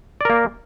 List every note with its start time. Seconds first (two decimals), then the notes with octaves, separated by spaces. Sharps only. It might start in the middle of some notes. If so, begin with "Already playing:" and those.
0.21 D5
0.25 A#4
0.30 A#3